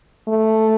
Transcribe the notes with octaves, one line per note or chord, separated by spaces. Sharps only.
A3